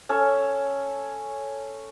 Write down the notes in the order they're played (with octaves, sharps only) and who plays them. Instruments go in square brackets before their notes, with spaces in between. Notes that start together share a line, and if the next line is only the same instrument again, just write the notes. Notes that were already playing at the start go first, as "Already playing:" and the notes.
[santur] C#4 A4 E5